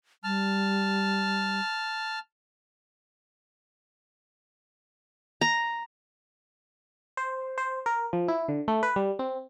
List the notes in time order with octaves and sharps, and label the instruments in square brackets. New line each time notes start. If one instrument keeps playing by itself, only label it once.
[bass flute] G3 [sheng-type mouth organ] A5 F6
[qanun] A#5
[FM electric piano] C5
C5
A#4
F3
E4
D3
A3
B4
G3
C4